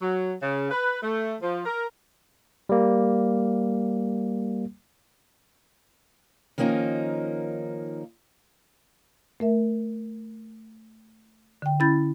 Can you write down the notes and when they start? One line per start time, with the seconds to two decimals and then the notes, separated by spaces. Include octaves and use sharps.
0.02 F#3
0.42 C#3
0.71 B4
1.02 A3
1.41 F3
1.65 A#4
2.69 G3 A#3
6.58 D#3 F3 A#3 C#4 D#4
9.40 A3 A#4 E5
11.62 D3 G5
11.80 C#4 E4 B5 G6 A6